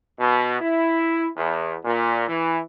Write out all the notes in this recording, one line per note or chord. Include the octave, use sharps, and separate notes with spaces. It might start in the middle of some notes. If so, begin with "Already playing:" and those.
B2
E4
E2
A#2
E3